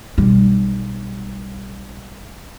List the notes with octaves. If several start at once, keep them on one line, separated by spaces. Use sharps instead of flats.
B1 G3